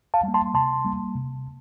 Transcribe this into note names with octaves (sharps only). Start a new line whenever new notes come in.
F5 A5
G3 A#3
A5 C6
C3 A5 C6
G3 A#3
C3